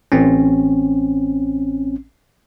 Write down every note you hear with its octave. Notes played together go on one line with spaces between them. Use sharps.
A1 C4 C#4